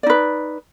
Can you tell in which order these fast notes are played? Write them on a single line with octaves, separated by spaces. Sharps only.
D5 D#4 B4